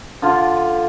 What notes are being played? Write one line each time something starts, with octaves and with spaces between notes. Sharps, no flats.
D3 F4